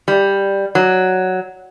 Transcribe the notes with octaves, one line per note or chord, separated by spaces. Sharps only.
G3
F#3